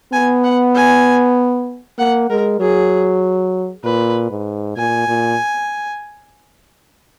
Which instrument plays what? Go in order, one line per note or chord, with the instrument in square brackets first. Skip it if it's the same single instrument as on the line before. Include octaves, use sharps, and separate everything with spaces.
[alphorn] B3 [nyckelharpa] G#5
[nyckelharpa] F#5
G#5
[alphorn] A#3 [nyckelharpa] F#5
[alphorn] G#3 [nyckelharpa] A#4
[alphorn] F#3 [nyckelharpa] G#4
[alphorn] A#2 [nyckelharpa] B4
[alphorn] G#2
[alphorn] A#2 [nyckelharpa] G#5
[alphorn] A#2